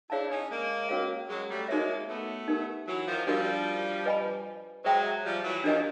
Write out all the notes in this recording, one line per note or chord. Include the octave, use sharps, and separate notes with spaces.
D4 E4 G#4 C#5 F5 A5
C#4 D#4
G#3 A#3
C#4 F#4 A#4 C#5 F5
F#3 G#3
G3 A3
G#3 A#3 D#4 F#4 A#4 C#5 E5
A3 B3
D#4 G4 A#4
E3 F#3
D#3 F3
F3 G3 D4 F#4 A#4 D5 F5
B4 D#5 G#5 B5
F#3 G#3 C5 E5 G5 A#5
F3 G3
E3 F#3
D#3 F3 D4 G4 A#4 D#5 G#5